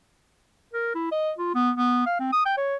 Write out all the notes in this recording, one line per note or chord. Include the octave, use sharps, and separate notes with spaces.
A#4
E4
D#5
F4
B3
B3
F5
C4
D#6
G5
C#5